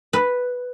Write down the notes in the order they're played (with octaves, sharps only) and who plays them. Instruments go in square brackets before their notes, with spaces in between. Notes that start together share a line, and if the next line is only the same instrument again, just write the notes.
[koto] B4